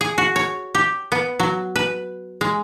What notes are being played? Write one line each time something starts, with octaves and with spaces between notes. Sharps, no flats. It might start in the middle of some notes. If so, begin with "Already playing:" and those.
G#4
F#4
C#5
G4
B3
F#3
B4
G#3